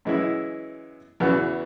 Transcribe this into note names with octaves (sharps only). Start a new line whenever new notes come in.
F#2 E3 G#3 E4
E2 C#3 E3 B3 F#4